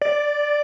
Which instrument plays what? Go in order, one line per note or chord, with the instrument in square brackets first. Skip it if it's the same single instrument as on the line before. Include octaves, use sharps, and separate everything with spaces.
[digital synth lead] D5